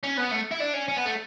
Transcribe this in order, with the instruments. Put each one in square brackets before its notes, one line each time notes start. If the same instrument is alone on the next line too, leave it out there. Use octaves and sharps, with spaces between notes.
[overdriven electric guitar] C#4
B3
A3
E4
D4
C#4
C#4
B3
A3